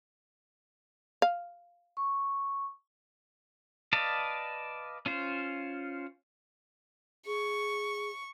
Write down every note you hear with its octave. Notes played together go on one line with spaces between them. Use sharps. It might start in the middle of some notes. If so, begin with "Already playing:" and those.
F5
C#6
B4 D5 D#5 F5 A5
C#4 F4 C5
G#4 C#6